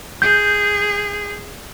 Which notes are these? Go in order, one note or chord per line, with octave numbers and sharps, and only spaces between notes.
G#4 G6